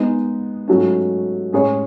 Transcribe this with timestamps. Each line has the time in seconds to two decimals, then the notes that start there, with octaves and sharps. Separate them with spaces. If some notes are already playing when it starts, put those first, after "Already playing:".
Already playing: G#3 B3 D#4
0.68 G#2 F#3 A3 C#4
1.53 A2 G#3 C#4 G#4 C#5